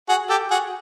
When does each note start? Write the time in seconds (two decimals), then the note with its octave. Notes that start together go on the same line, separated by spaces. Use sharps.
0.09 F#4 G#4
0.29 G4 A4
0.51 F#4 G#4